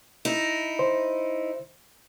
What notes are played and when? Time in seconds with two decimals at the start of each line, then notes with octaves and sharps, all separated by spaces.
0.25 D#4 E4
0.79 C5